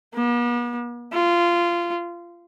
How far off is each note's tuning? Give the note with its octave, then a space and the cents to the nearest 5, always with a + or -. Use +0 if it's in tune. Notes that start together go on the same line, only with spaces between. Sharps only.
B3 -45
F4 -20